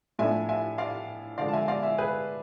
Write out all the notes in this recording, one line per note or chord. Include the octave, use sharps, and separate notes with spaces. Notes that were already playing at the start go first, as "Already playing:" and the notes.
A2 F3 A3 D4 E5 G#5
E5 G#5
D5 F5
D3 F3 G#3 D5 F5
A5
E5 G#5
D5 F5
E5 G#5
G#4 B4